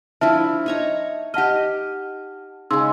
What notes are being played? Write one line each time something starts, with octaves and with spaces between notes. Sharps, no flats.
F3 D4 E4 E5 A5 F6
D#4 C#5 A#5
G4 D#5 F#5 A5 F6
C#3 G#3 D#4 C6 E6